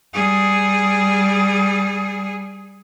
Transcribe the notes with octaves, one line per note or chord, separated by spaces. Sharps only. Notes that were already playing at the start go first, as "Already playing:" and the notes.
G3 G#4